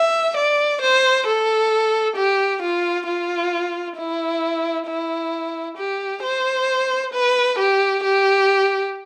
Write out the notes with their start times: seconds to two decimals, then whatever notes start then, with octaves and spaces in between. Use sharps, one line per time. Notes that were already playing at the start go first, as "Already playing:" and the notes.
Already playing: E5
0.36 D5
0.81 C5
1.26 A4
2.16 G4
2.62 F4
3.07 F4
3.97 E4
4.87 E4
5.77 G4
6.23 C5
7.13 B4
7.59 G4
8.03 G4